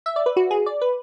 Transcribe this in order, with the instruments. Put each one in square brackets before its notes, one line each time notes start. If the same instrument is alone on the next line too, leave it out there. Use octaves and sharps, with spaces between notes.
[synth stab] E5
D5
B4
F#4
G#4
D5
B4